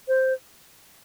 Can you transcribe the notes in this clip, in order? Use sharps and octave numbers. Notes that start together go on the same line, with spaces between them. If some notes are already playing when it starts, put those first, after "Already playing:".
C5